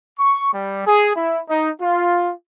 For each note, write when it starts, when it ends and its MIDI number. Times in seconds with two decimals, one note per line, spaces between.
0.19 0.53 85
0.53 0.82 55
0.86 1.13 68
1.16 1.41 64
1.49 1.70 63
1.81 2.33 65